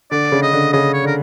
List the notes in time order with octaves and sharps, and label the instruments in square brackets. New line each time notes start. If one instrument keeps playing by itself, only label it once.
[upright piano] D3 [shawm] D5
[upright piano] C#3
[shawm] D#5
[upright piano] D3
[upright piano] C#3 [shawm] D#5
[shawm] C#5
[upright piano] D3 [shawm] A#4